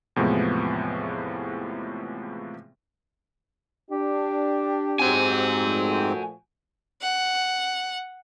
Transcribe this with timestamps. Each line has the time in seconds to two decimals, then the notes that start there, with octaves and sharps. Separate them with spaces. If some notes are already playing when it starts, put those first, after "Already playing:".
0.16 E2 A2 C3 F3 G#3 B3
3.91 D4 G4
4.99 G#2 C4 F#4 G#5
5.62 A#2 F3 A3
7.02 F#5